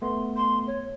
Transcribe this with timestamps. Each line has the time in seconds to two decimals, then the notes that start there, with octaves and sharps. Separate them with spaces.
0.02 A3 B3 C6
0.36 C6
0.67 C#5